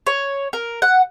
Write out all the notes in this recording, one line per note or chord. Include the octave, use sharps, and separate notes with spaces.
C#5
A#4
F#5